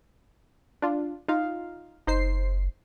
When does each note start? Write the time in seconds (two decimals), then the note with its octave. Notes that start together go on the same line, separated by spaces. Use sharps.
0.82 D4 F4
1.28 D#4 F4 F5
2.07 F#1 D#4 C5 C7